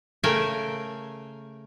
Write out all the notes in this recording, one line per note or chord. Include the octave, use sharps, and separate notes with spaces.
C#3 A3 A#4 G5 G#5